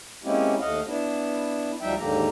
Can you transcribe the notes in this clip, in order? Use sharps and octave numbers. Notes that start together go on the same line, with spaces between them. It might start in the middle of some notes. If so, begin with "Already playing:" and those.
G#3 A#3 C4 C#4 E4 G4
D#2 A3 D#5 F5 F#5
B3 D4 E4
D2 F3 G3 D#4 E5 G5
D#2 G#2 D3 A#3 G4 A#5